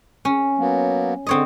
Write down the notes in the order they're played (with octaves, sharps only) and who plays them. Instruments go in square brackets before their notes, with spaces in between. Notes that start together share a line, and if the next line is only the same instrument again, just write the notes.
[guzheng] C#4
[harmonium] F#3 A#3 B3
[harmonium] D3 [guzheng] C4 C#5 D#5